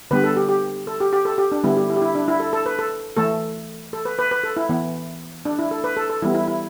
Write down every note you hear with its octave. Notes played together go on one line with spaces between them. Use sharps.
D3 G3 B3 B4
A4
G4
G4
A4
G4
G4
A4
G4
D4
D3 G3 B3 E4
G4
E4
G4
E4
D4
E4
A4
A4
B4
A4
E3 A3 A4
A4
B4
B4
B4
A4
E4
E3 B3
D4
E4
A4
B4
A4
A4
E3 G3 B3 E4
E4
E4